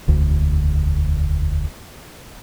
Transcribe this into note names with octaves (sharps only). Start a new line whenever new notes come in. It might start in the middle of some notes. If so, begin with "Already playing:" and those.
E1 D2